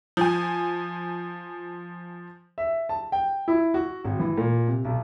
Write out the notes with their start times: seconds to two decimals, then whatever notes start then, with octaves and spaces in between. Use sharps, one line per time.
0.17 F3 G#5
2.58 E5
2.89 A5
3.12 G5
3.48 E4
3.74 F#4
4.05 G#1
4.19 E3
4.38 A#2
4.68 C3
4.85 B1